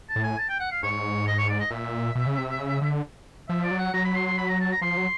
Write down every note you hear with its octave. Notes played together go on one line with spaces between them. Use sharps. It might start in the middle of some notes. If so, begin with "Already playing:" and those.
A5
A2
G#5
A5
G5
F#5
F5
G#2 C#5
D#5
C#5
D5
D#5
A#2 E5
B2
C#3
C3
C#3
D3
F3 E5
D5
F#3
F#5
F#3 A#5
B5
C6
C6
B5
A#5
A5
A#5
F3 C6
F#3